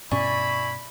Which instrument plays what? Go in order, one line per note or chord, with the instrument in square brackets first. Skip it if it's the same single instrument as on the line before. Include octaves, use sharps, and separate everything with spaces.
[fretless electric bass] G2 B2 C#4 [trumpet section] E4 B5 [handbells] D5 G#5 [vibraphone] C#6